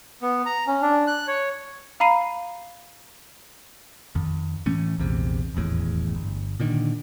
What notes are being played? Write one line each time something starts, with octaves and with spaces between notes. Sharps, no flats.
B3
A#5
C#4
D4
F#6
C#5
F5 A#5 B5 C7 D#7
F2 D#3
A2 E3 A3 C#4
A#1 E2 C3
D#1 G#1 E2 A2
G1
A#2 D3 D#3